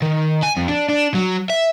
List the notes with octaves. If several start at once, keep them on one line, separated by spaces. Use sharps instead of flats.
D#3
G#5
F2
D4
D4
F#3
E5